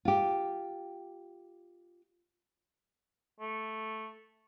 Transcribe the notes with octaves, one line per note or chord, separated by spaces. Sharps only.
F4 G4
A3